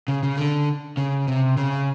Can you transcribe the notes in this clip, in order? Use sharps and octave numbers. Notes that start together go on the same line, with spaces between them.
C#3
C#3
D3
C#3
C3
C#3